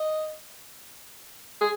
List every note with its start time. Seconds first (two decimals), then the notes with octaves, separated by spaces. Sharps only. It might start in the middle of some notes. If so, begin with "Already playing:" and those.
Already playing: D#5
1.61 G#4